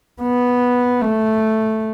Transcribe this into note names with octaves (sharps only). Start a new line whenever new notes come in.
B3
A3